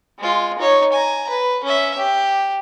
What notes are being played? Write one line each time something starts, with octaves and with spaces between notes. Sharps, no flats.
G#3 F4
D#4 C#5
G#5 A#5
B4
C#4 E5
G4